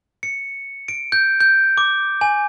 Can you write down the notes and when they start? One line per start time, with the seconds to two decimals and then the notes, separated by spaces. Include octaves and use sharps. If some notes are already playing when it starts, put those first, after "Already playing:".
0.23 C#7
0.88 D7
1.12 G6
1.40 G6
1.78 D6
2.21 G#5